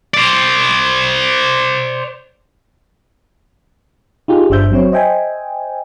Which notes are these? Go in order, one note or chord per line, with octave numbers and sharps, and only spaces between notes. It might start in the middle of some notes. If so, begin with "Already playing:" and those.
C5 D5
D#4 F4 G4 G#4
G1 D4 C5 E5 G6
F#3 C4 C#5
C5 D#5 E5 G5 G#5